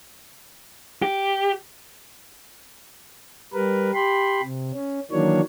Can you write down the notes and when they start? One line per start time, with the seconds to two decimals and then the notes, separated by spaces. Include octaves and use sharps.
1.02 G4
3.53 G3 A#4 B4
3.94 G4 B5 C6
4.43 C3
4.73 C#4
5.12 D#3 E3 F#3 A#3 D4 C#5